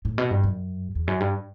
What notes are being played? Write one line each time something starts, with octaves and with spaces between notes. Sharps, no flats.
A2
B2
G2
F#2
E2
F#2
G2